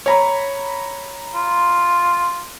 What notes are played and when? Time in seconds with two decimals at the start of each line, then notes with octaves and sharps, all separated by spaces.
0.06 C#5 A#5 B5
1.34 F4